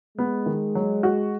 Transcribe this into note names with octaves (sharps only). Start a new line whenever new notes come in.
G#3 B3
D#3
F#3
F#4